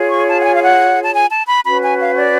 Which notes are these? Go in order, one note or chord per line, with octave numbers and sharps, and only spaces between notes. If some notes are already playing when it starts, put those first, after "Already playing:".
Already playing: F4 G#4 C#5
C#6
A5
F#5
G#5
F5
F#5
A5
G#5
A5
B5
C#4 F#4 B4 B5
G#5
F5
D5